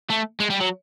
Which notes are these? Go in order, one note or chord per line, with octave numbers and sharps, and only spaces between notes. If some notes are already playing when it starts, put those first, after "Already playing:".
A3
G#3
G3
F#3